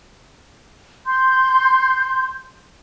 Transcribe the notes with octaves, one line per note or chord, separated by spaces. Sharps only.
C6 G6